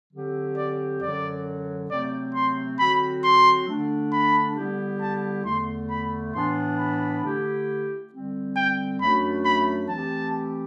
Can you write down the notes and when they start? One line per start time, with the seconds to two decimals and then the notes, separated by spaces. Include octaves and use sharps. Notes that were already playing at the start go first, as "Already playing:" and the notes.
0.13 D3 F#3 C4 G4
0.57 D5
1.01 F#2 D3 F#3 D5
1.90 C3 F#3 A3 C4 D5
2.35 C6
2.79 D3 F#3 C4 F#4 B5
3.24 C6
3.68 D3 A3 D4
4.12 B5
4.56 D3 G3 B3 E4 G4
5.01 A5
5.45 E2 D3 A3 C6
5.90 B5
6.34 A2 E3 B3 D4 C6
6.79 B5
7.23 D3 A3 E4 G4
8.12 D3 G3 C4
8.56 G5
9.00 F#2 F#3 A3 D4 F#4 B5
9.45 B5
9.89 E3 A3 C4 G4 A5